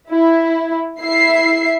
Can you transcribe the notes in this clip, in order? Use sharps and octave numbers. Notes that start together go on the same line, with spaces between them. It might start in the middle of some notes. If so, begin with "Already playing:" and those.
E4
E4 E5 C7